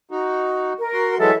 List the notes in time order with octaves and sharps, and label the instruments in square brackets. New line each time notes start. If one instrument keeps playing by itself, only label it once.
[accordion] D#4 F#4
[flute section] A#4
[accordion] F#4 C6
[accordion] E3 F#3 G#3 [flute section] A4 E5